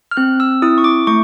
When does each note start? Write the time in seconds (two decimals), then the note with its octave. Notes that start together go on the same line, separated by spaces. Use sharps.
0.11 F6
0.17 C4 F#6
0.40 E6
0.62 E4 D#6
0.78 C#6
0.84 D6
1.07 A3 C#6